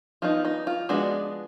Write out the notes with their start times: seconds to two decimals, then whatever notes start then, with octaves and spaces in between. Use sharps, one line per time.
0.22 F3 B3 D#4 F4
0.45 D#4
0.67 F4
0.89 F3 G#3 B3 D4 F#4